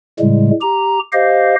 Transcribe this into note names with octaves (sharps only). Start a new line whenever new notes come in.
A2 C#3 G3 G#3
G4 A#5
G4 C5 D#5 F5